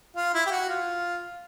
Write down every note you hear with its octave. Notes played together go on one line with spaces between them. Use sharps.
F4
E4
G4
F#4
F4